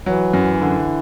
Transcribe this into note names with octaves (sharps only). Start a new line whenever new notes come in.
E3 F#3
F#2
D3